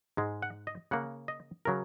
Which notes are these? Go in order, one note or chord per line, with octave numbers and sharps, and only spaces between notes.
G#2 G#3
F#5
D#5
C#3 A#3 F#5
D#5
C#3 F#3 A#4